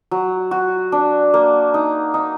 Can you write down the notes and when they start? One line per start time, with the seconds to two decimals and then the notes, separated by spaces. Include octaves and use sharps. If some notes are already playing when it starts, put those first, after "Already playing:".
0.11 F#3
0.51 F#4
0.92 D4
1.34 A#3
1.74 D#4
2.14 D#4